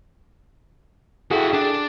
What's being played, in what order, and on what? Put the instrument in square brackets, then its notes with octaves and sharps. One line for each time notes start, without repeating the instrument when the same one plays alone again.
[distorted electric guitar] E4 F#4 [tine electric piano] G#4 A4 G5
[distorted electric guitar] D4